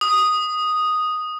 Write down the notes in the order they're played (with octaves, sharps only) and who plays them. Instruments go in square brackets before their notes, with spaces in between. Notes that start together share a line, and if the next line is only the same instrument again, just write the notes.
[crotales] D#6